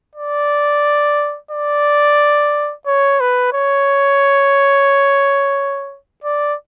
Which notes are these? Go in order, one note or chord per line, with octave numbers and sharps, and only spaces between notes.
D5
D5
C#5
B4
C#5
D5